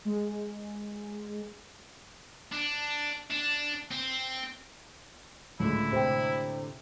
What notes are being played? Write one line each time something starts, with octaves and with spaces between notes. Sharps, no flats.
G#3
D4
D4
C4
C#2 A2 D3 G#3 E4
C3 C5 G5